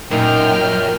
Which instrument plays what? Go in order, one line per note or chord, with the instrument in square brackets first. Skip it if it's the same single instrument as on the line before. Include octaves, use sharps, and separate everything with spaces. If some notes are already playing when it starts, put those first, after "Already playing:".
[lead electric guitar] F#2 [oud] A#2 D#4 [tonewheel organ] A#4 [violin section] G5 F6